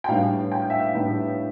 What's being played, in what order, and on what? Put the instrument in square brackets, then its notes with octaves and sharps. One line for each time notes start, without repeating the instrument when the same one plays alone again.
[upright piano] G5
A2 G3 B3 D4 F5
G5
F5
E5
F5
A2 G3 B3 D4